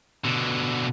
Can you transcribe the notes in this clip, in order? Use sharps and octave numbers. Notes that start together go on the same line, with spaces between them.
B2 D3